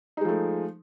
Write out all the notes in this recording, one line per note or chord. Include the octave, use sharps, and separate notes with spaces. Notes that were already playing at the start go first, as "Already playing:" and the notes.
F3 G#3 A3 D#4